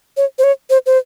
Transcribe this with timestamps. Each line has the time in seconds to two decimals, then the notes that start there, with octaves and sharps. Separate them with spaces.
0.17 C#5
0.39 C5
0.44 C#5
0.70 C5
0.86 C5